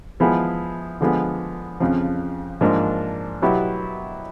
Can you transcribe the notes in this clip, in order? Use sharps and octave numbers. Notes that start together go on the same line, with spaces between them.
F3 G#3 B3 E4 G#4
D3 F3 G#3 B3
F2 C#3 F3
G#2 F3 A#3 D4
B2 F#3 B3 E4 G4